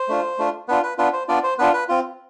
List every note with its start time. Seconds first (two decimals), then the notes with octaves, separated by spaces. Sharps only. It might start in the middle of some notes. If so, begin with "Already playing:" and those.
Already playing: C5
0.08 A3 D4 F4
0.38 A3 D4 F4
0.68 B3 D4 F4 B4
0.83 B4
0.98 B3 D4 F4 B4
1.13 C5
1.28 B3 D4 F4 D5
1.43 C5
1.59 B3 D4 F4 B4
1.73 B4
1.89 C4 F4